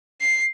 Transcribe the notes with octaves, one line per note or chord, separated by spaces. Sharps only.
C7